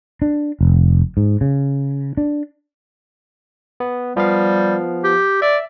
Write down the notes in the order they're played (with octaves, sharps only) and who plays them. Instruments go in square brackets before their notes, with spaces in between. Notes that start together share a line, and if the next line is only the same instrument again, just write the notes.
[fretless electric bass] D4
F1
G#2
C#3
D4
[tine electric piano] B3
[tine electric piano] F3 B3 F5 [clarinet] G3
[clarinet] G4
[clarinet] D5 [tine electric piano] E5